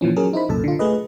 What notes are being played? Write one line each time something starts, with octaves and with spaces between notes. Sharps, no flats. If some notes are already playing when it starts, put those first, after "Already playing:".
A#2 E3 F3 C#4
F#3 C#4 G#4 A#4
D#4 E4 C5 B5
C2 F#2 A#2 A4 A5
D3 F4
A3 G#4 B4 D#5